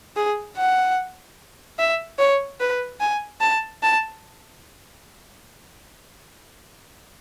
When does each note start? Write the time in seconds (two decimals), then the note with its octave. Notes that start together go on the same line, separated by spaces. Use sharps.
0.16 G#4
0.57 F#5
1.79 E5
2.19 C#5
2.60 B4
3.00 G#5
3.41 A5
3.83 A5